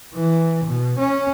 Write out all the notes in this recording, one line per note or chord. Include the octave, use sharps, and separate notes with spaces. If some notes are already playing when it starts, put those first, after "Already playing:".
E3
B2
C#4